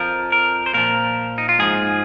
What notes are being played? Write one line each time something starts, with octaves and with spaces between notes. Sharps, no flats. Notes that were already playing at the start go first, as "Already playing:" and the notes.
Already playing: F2 F3 A#4
A#4
C5
A#2 F3 A#4
D#4
F4
G#2 F3 G#4